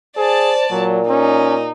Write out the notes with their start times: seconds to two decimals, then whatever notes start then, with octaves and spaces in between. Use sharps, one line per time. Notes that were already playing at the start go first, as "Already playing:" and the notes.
0.17 G#4 C5 D5 A5
0.70 A#2 F#3
1.09 C#4 D#4